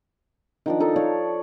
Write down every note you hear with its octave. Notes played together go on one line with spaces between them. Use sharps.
D#3 F3 D4
F3 D#4 A4
C#5 D5 F5